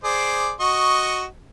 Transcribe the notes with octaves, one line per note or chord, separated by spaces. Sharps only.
G#4 C5 D5
F#4 D#5 C#6